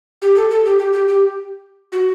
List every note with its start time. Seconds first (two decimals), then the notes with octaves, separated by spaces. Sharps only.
0.22 G4
0.36 A4
0.50 A4
0.65 G4
0.79 G4
0.93 G4
1.07 G4
1.92 F#4